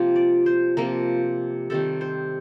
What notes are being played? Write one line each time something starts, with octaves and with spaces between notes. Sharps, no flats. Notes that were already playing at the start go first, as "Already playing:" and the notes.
Already playing: C3 F3 A#3 F4 G4
D5
C5
C3 F3 A#3 A#4
C3 D#3 G3 A4
C5